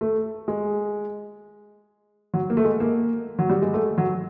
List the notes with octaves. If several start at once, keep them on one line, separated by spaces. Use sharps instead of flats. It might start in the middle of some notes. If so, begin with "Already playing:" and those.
A3
G#3
F#3
A#3
A3
G#3
A#3
F#3
G3
G#3
A3
F#3